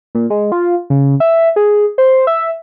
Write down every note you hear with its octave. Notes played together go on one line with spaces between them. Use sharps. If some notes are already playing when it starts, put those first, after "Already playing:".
A#2
G#3
F4
C#3
E5
G#4
C5
E5